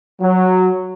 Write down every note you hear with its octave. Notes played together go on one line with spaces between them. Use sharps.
F#3